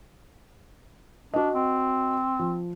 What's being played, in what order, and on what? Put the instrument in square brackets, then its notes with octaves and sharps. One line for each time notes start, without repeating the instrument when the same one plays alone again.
[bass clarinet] D4 [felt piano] F#4 D#5
[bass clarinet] C4
[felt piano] F3